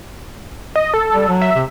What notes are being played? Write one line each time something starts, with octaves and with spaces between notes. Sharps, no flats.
D#5
A4
G3
F#3
E5
C3